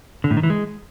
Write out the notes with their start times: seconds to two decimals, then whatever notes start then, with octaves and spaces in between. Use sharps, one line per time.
0.24 D3
0.31 A2
0.37 D#3
0.43 E3
0.50 G#3